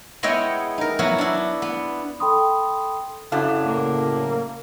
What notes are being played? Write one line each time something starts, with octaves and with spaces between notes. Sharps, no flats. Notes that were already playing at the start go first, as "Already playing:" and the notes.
G#3 B3 E4 C#5 D#5 G5
D#4 A#4
F#3 B3 E4 F#4
D4 E4
B3
A4 G5 B5 C6 D#6
F#2 C#3 F#3 D4 E4 A4 F5
A2 A#3